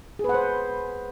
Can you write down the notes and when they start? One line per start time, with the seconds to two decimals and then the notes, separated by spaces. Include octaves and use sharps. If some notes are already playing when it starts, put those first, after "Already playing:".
0.19 G#4
0.24 B4
0.29 F#5
0.34 C5